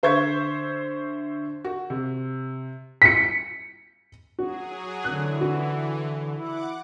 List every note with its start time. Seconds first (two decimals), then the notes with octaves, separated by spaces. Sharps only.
0.03 D3 C5 E5 C#6 G#6
1.65 F#4
1.90 C3
3.02 B6 C#7
4.39 F#3 F#4 G#4
5.04 D3 E3 F#6
5.41 F#4
6.39 E4 F#5 D6